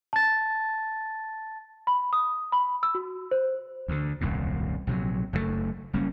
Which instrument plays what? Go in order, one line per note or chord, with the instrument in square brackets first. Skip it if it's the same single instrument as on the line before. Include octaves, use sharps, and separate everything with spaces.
[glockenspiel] A5 A6
[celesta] B5
D#6
B5
E6
F#4
C5
[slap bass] D2 D3
D#1 C2 F#2 A2
A#1 C3 F3 F#3
F#1 F#2 A#2 A3
F#1 G3 A#3 C#4